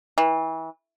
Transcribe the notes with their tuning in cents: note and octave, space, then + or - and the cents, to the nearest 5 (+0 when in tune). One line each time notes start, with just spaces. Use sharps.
E3 -30